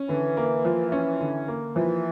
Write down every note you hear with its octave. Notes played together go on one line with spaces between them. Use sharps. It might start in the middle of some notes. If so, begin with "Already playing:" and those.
Already playing: C#4
D3 E3
A#3
F3
C#4
D3
A#3
E3 F3